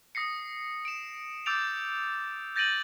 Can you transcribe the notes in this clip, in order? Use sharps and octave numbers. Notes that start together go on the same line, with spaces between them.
D#6 A#6 C7 C#7
D7 E7
D6 E6 G6 A6 D7 F7
G6 A6 A#6 D7 D#7 F#7